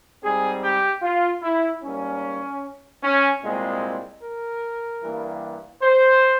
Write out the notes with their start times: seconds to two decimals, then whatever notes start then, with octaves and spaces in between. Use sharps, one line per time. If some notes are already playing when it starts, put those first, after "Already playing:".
0.23 G#2 G3 C4 G#4
0.63 G4
1.03 F4
1.43 E4
1.83 G#2 G3 A#3 C#4
3.03 C#4
3.43 C2 A#2 G#3 C4
4.22 A#4
5.03 G2 E3 G3 A#3
5.82 C5